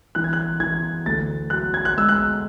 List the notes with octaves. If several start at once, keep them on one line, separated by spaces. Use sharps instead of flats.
E3 F#6
G#6
F#6
E3 G#6
D2 A6
F#3 F#6
G#6
F#6
G#3 E6
F#6